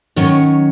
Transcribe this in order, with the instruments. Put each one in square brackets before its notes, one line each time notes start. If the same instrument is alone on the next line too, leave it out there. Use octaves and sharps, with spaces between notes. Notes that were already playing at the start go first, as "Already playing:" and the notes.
[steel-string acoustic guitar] D#3 F#3 C#4 C#5